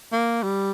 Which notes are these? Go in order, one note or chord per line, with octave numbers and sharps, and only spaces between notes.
A#3
G3